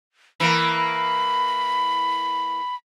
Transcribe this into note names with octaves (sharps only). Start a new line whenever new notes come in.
E3 A#3 B5